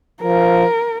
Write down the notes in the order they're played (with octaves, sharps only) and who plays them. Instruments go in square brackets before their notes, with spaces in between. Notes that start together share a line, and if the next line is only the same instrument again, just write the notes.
[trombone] F3 [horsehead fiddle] A#4